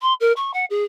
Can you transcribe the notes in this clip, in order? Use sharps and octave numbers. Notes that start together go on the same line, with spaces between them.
C6
A#4
C#6
F#5
G#4